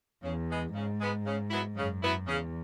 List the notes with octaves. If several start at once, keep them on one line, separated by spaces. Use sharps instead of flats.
E2 C#3
G#3 B3
G#2 C#3
G#3 B3
C#3
F#3 B3 E4
F#2 C#3
F#3 B3 E4
E2 C#3